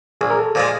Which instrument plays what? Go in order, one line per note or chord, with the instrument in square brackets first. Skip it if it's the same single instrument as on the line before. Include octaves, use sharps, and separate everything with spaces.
[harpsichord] A#1 [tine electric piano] G#4
[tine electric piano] A#4
A4
[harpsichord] A#2 F3 G#3 [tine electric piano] C5